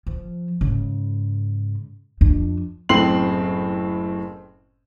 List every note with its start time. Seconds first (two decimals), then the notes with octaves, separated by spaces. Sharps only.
0.07 F3
0.61 G#2 C#3
2.21 F2 D4
2.89 F#1 A2 C4 C6 C7 F#7